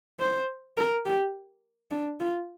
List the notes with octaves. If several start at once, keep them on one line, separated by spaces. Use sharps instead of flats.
C5
A#4
G4
D4
F4